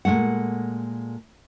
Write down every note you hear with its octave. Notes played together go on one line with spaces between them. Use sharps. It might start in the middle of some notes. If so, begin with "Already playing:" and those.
A#2 D#3 G#3 A3 F#5